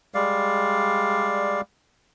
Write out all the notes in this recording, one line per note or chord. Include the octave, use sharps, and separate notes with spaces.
G3 G#3 D5 F5